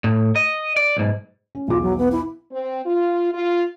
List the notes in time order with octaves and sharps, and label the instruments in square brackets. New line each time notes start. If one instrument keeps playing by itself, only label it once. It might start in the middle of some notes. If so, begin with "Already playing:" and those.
[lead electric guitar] A2
D#5
D5
B1 G#2
[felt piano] C#4
[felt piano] B1 E2 D6 [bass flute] F4
[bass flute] F#3
B3
E4
[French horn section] C4
F4
F4